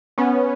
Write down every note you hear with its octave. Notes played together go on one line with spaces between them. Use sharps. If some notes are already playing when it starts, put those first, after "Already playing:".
B3 C#4